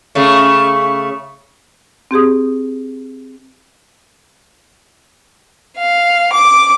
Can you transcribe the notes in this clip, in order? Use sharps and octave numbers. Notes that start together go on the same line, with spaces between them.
C#3 A3
C4 G4 G#4 D#6
F5
D6